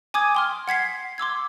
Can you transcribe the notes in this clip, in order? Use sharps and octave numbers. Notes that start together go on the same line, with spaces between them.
G#5 D6 D#6 G#6
G5 C6 F6
F#5 G#6 B6 C7
C6 D6 E6 G#6